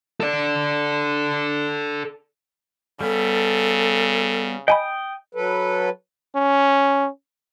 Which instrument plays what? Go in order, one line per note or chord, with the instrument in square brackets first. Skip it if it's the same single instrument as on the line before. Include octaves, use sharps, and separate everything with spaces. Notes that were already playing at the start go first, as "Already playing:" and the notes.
[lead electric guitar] A4 D5
[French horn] C#3 [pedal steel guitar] G3 B3 [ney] A4
[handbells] D#5 G#5 B5 [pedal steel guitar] G5 D#6
[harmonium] F#3 A4 B4
[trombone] C#4